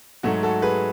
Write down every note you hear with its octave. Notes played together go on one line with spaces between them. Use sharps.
G#2 F#3 A3 F#4
F#4 A4
G#4 B4